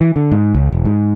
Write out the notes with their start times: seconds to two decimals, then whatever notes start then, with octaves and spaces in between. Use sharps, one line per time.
0.01 E3
0.16 D3
0.32 G#2
0.55 C#2
0.72 E1
0.85 G#2